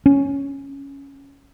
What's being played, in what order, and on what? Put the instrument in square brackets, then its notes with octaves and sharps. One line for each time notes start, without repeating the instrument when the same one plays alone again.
[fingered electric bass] C#4